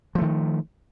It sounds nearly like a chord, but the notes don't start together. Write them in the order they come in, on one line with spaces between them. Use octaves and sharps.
F3 A3 D#3